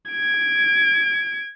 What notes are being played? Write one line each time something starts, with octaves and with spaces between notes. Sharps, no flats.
G#6 D7